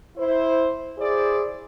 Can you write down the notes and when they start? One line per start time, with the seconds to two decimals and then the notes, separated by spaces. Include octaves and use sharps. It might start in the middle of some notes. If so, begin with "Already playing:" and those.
0.17 E4 C5
0.98 E4 G#4 C5 D5